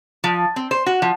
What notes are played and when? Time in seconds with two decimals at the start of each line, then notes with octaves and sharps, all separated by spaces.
0.24 F3
0.56 C4
0.71 C5
0.86 F#4
1.02 F3